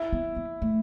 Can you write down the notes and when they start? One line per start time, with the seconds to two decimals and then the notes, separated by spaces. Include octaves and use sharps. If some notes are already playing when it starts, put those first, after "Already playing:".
Already playing: E4
0.13 B3
0.37 B3
0.62 A3